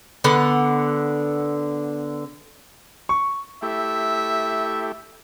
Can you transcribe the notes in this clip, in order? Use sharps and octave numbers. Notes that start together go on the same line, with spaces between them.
D3 B3 F#5
C#6
A3 E4 G4 E5